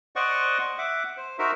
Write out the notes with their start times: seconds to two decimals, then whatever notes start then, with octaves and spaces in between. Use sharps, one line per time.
0.16 C5 D5 D#5 F#5 C#6
0.78 E5 F#5 D6
1.17 C5
1.39 D#4 F#4 A#4 C5 E5